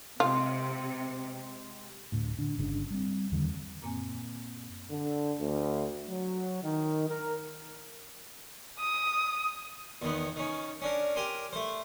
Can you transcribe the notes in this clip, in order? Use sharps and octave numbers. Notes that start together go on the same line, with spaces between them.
C3 G#3 F4 G4
D2 A2
D3 D4
G1 C#3 D4
G3 C4
E2 D3 D#3 G3
F#2 A#2 A#3 C4 G#5
D3
D2
F#3
D#3
A#4
D#6
E2 D#3 B3
D#3 C#4
C#4 D4 A#4
G4 A#4 G#5 C6
A3 C5